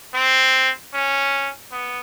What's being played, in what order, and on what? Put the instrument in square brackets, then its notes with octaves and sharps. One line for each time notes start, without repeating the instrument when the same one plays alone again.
[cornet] C4
C#4
B3